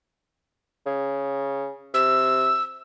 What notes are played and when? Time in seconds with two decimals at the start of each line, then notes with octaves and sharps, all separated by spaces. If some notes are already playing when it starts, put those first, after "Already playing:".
0.86 C#3
1.94 C3 E6